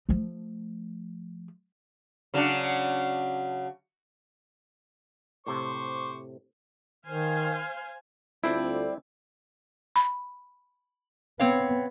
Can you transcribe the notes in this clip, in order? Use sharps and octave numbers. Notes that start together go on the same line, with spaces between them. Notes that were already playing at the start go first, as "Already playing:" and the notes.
F3 A3
C#3 F#3 D4
A2 C3 C5 C#6 D6
D#3 C5 F5 G#5
D2 G3 C4 E4 F4 A4 D5
B5
B3 C4 C#5 F5